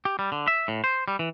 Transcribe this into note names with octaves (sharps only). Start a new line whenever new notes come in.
G4
G3
D3
E5
A2
C5
G3
E3